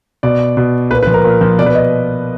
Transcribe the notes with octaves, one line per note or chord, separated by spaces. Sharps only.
B2 D5
B2
A#2 B4
B4
F3
A#4
A#2
F3
B2 D5
B4
D#5